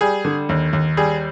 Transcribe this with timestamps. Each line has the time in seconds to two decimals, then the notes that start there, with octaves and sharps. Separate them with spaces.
0.01 G3 G#4
0.25 D3
0.49 D#2
0.73 D#2
0.97 G3 G#4